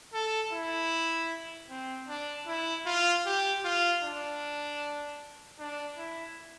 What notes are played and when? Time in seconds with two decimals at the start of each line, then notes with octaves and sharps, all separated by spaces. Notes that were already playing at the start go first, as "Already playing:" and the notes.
0.14 A4
0.53 E4
1.70 C4
2.09 D4
2.48 E4
2.86 F4
3.26 G4
3.64 F4
4.03 D4
5.59 D4
5.98 E4